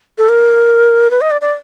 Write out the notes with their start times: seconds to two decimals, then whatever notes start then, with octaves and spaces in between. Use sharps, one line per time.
0.18 A4
0.29 A#4
1.11 B4
1.21 D#5
1.31 D5
1.41 D5